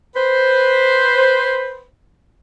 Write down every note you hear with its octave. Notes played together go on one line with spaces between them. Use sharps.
B4 C5